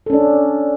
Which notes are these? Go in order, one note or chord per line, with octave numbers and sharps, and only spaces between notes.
C#4 D4 A4